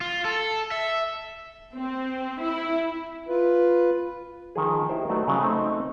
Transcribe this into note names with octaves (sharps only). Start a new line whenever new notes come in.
F4
A4
E5
C4
E4
F4 B4
D#3 F3 G#4
D#4 E4 G4 A#4 C5
F#3 A3 D#4 F#4 B4 D5
C#3 F#3
A3 C4 D#4